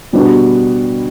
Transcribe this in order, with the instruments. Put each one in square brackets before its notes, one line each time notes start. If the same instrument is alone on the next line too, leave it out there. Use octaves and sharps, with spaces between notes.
[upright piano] B2 G3 B3 D4 F#4